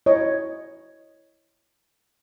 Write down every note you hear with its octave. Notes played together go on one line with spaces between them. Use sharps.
E4 C#5 D#5